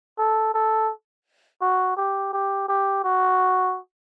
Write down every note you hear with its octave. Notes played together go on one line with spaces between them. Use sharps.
A4
A4
F#4
G4
G4
G4
F#4